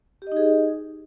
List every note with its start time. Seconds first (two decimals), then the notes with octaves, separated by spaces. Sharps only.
0.22 G4
0.27 D#5
0.32 D#4
0.37 G#4